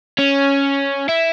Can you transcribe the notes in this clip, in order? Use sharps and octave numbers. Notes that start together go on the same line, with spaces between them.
C#4
E4